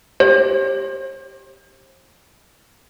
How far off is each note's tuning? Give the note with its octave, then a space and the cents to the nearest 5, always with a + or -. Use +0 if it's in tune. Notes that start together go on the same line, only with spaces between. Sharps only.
G4 +0 C5 +40